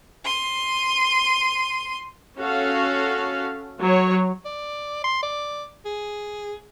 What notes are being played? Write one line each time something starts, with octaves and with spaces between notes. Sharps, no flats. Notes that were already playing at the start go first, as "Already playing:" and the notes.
C6 D#7
C#4 F#4 A4 F5
F#3 C#5
D5
C6
D5
G#4